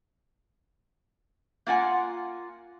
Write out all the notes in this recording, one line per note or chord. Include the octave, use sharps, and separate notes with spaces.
A#3 F4 F#5 G#5